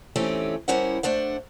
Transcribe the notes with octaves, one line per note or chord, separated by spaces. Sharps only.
E3 A3 C4 C#4 D#4 G4
G3 C#4 E4 A#4 C5 F#5
A3 D4 C5 F#5